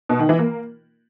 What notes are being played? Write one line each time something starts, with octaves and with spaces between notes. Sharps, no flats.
B2
D#3
E3
A#3